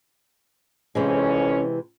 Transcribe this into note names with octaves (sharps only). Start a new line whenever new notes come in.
F2 C3 E3 G#3 C#4